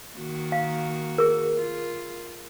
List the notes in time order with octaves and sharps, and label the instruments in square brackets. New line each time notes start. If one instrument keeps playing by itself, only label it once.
[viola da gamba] D#3 A#3 F#4
[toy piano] F5
G#4 A#4
[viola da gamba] F4